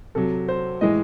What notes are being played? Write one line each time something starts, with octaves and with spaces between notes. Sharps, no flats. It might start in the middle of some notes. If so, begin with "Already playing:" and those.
C3 F#3 A4
C5
A2 E3 G#3 D#5